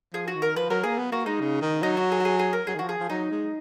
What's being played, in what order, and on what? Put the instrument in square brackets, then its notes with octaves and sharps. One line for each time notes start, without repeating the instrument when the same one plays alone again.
[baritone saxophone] F3 [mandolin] G#4
[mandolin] F#4
[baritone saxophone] D#3
[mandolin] A#4
[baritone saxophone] F3 [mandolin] B4
[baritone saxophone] F#3 [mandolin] A#4
[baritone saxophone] A#3 [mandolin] G#4
[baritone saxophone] B3
[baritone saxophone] A#3 [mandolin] F#4
[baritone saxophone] G#3 [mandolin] D#4
[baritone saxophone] C#3
D#3
[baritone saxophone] F#3 [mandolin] D#4
[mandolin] F#4
G#4
F#4
G#4
G#4
A#4
[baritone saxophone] F#3 [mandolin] G#4
[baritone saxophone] D#3
[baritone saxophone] F3 [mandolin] F#4
[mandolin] G#4
[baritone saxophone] F3
[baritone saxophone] F#3 [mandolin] D#4
[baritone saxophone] G#3